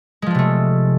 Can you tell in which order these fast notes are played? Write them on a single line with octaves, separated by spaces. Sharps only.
G#3 F3 D4 C3 A3